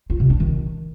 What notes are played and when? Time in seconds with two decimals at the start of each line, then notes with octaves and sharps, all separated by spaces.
0.10 F4
0.20 C3
0.30 D4
0.40 D#3